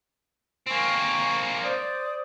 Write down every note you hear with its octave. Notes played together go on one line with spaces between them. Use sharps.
A#3 C4 G#5 C#6
C5 D5 D#6